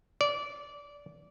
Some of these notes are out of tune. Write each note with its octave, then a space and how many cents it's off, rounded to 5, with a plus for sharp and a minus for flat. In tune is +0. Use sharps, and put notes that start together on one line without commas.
D5 -20